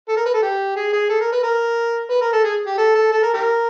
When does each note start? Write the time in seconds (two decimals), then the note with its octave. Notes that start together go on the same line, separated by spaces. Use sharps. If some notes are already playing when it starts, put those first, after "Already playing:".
0.09 A4
0.17 A#4
0.26 B4
0.34 A4
0.43 G4
0.76 G#4
0.93 G#4
1.10 A4
1.21 A#4
1.32 B4
1.43 A#4
2.11 B4
2.22 A#4
2.33 A4
2.44 G#4
2.67 G4
2.78 A4
2.95 A4
3.12 A4
3.23 A#4
3.34 G4 A#4